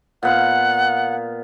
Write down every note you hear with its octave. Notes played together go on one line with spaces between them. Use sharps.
A#2 B3 F5 F#5